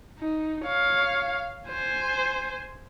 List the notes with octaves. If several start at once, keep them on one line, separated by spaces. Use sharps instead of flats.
D#4
C#5 F5
C5 G#5